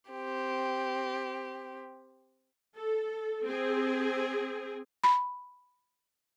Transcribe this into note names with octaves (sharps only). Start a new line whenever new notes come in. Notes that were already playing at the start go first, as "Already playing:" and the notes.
C4 G4
A4
C4 G#4
B5